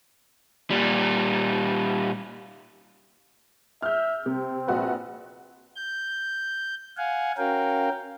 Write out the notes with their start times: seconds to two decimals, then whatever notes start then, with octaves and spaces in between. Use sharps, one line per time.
0.70 A#2 G3
3.82 E5 F6 G6
4.26 C3 C4
4.67 A#1 F#4 B4
5.76 G6
6.97 F5 F#5 G#5
7.38 C#4 F#4 A#4 F5 G5